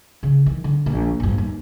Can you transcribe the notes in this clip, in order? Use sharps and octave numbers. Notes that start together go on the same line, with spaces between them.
C#3
D#3 E3
D3
A#1
A#1 G2
D#2